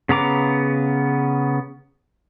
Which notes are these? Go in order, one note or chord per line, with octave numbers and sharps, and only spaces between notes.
C#3 B3 A#5 D6